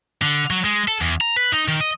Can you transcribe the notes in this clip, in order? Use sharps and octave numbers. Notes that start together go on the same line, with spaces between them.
D3
F#3
G#3
A4
E2
A#5
B4
D#4
D#3
D#5